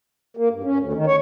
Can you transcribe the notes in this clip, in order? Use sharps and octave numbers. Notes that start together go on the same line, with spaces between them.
A#3
G2
C#4
D2
D#3
C#5